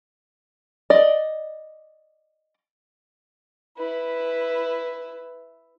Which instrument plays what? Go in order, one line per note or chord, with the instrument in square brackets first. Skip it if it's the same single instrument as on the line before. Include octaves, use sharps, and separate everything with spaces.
[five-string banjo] D5 D#5
[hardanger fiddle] E4 B4